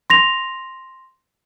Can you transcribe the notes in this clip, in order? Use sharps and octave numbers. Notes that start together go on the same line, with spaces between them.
C6 A#6 F7